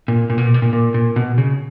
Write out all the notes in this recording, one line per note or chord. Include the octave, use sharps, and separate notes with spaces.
A#2
A#2
B2
A#2
B2
A#2
A#2
A#2
B2
C#3